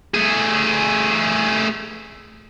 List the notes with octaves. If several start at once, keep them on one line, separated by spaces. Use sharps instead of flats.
A3 G#4